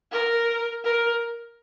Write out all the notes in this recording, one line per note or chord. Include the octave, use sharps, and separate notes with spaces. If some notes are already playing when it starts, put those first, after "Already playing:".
A#4
A#4